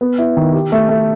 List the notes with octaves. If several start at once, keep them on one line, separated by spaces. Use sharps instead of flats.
B3
E4
D#3
G4
A3
A3